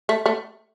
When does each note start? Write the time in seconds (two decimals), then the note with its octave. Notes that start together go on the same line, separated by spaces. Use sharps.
0.09 A3
0.26 A3